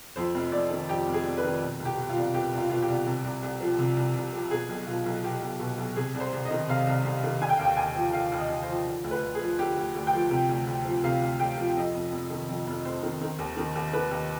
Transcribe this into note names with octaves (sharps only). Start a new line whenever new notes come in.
F2 C5
F1
F1 D5
D#3
F2 G4
F1
G#4
F1
B4
D#3
B2
C2
G4
B2
F4
C2
B2 G4
C2
F4
B2 F4
G4
C2
C3
C2
C2
F3
C3
C2
C2
F3
B2 G#4
B1
B2 F4
B1
B2 G4
B1
B2
B1
C3 G#4
C2
C5
C2
D#5
D#3
C3 F5
C2
C2
D#3
D3 G#5
G5
D#2 F5
G5
D#2 G#5
F3
D3 F5
D#2
D#5
D#2
C5
F3
D3
D2
B4
D2
G#4
F3
D3 G4
D2
D2
G5
F3
C3
D2
D2
F3
C3 F5
D2
D2 G5
F3
F2 D#5
F1
F1
D#3
F2
F1
F1 C5
D#3
D#3
D#2
D#3
D#2
D#3 B4
D#2